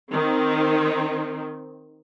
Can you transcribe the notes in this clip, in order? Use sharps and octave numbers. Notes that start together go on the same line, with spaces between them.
D#3 C4